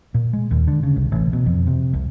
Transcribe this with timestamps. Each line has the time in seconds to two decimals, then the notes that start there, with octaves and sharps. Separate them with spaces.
0.14 A#2
0.33 G#3
0.51 D#2
0.68 D3
0.83 C#3
0.97 C2
1.12 A1
1.33 B2
1.46 F2
1.67 C3
1.94 C2